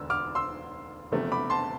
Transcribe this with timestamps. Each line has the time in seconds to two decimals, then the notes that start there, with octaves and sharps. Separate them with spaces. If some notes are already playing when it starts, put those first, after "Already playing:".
Already playing: E1 D2 D3 E6
0.10 D6 F6
0.35 C6 E6
1.12 E1 E2 C3 F3 A3
1.32 B5 D6
1.50 A5 C6